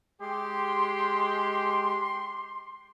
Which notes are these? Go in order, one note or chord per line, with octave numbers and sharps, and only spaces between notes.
G#3 G4 C6